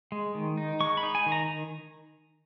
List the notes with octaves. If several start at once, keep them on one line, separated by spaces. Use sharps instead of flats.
G#3
D#3
D#4
G#3 C#6
B5
D#4
G#5
D#3
A#5